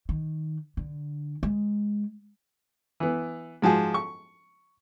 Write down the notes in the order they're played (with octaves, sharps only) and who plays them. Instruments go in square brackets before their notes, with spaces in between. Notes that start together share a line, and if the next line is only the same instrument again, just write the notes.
[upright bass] D#3
D3
G#3
[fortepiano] E3 B3
G#2 F3 F#4 G#4
C#6